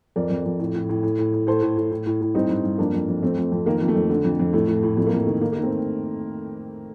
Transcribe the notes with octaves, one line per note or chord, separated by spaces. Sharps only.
F2 A#4 D5
F2
F2
A2
A2
A2
A2
A2
A2
A2 A4 C5
A2
A2
A2
A2
A2
G2 C4 D#4
G2
G2
F2 A#3 D4
F2
F2
F2 A3 C4
F2
F2
D#3 A#3
F2
A3
F2
D3
F2
F2
A2 A3
A2
A2
F2 A3
A#3
F2 A3
D#3
D#3 A#3
A#3
D#3
A3 C4